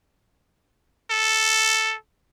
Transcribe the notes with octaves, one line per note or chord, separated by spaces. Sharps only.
A4